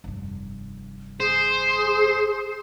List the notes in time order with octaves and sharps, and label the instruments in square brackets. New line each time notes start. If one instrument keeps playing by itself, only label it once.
[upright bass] F1 G2
[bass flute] G#4 [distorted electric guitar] C5